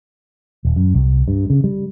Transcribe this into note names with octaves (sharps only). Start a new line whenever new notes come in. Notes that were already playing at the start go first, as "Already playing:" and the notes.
D#1
F#2
C2
G2
C#3
G3